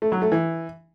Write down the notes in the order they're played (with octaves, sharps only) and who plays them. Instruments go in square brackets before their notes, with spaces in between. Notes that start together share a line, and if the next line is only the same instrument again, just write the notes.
[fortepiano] A3
F#3
A3
E3